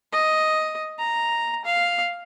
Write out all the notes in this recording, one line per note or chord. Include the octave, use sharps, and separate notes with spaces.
D#5
A#5
F5